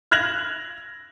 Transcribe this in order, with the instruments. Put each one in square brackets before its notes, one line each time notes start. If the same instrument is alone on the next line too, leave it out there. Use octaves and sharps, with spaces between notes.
[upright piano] F6 F#6 G#6 A#6 F7 F#7